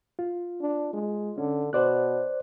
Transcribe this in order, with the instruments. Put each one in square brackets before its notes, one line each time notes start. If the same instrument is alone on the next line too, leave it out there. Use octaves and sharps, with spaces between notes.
[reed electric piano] F4
[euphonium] D4
G#3
[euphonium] D3 [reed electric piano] C#4
[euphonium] B2 [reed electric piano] C5 D5 F#6